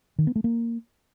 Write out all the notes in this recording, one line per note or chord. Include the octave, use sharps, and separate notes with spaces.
D#3
B3
A3
A#3